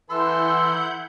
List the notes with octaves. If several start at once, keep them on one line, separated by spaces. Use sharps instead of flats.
E3 E4 A4 F#5 C6 E6 G6